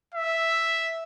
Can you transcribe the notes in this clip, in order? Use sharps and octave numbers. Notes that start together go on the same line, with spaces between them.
E5